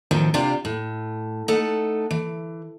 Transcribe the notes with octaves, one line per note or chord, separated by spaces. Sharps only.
A2 D#3 F3 F#3 C4
C3 D4 F4 G4
A2
A3 D#4 A4 F#5
E3